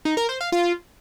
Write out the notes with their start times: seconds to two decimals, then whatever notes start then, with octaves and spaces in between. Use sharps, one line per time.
0.05 D#4
0.17 A#4
0.29 C5
0.41 F5
0.52 F4